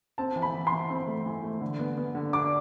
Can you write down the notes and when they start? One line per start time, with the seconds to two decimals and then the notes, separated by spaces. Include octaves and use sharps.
0.18 C4 A5
0.36 E3
0.42 B5
0.54 E3
0.67 C6
0.72 E3
0.90 C4
1.07 A3
1.26 E3
1.43 A3
1.61 D3
1.79 B3
1.98 B3
2.15 D3
2.33 D4 D6